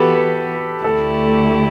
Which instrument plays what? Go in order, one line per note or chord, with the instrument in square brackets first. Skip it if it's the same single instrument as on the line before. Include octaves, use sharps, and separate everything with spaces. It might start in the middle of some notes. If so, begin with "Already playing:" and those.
Already playing: [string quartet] E3 B3 F#4 [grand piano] G4 A4 B4
[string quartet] D2 D3 A3 E4 G4 [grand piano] A4